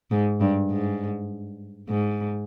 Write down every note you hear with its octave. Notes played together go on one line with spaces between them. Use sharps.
G#2
G2
G#2
G#2